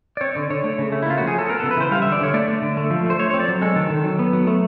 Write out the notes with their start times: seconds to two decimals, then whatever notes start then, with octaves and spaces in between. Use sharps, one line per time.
0.17 D5
0.21 C4 C#5
0.35 D3 D5
0.50 D3 C#5
0.64 A3
0.78 C#3
0.92 A3
1.02 E4
1.06 A#3 F4
1.18 F3 F#4
1.28 G#4
1.34 C#4 A4
1.49 B3 A#4
1.60 C#3 A4
1.71 B4
1.77 E3 C5
1.91 G3 F5
2.02 D3 E5
2.12 D5
2.21 D3 C#5
2.34 A3 D5
2.48 D3
2.62 D3
2.77 A3
2.90 F3
3.06 A3 C5
3.19 A3 C#5
3.30 C4 C#5
3.40 D5
3.48 F#3
3.62 G#3 A4
3.76 D#3
3.90 D#3
4.04 F#3
4.19 B3
4.33 F#3
4.47 A3